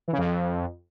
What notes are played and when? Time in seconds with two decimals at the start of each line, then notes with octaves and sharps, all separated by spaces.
0.08 E3
0.13 C#3
0.18 F2